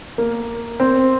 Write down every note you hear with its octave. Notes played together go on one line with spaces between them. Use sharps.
A#3
C4